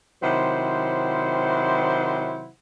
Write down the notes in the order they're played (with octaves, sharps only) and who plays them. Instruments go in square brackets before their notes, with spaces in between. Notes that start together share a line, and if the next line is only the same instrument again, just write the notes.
[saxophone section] C3 D#3 F#3 E4 C5 F#5